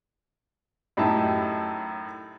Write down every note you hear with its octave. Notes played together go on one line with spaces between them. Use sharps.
F#2 A2 D#4 E4 G4 A5